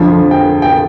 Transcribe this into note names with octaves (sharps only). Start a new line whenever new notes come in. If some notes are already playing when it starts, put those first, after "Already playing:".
Already playing: F2 D3 F3
G5
G5